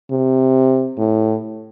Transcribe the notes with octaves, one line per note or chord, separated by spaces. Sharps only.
C3
A2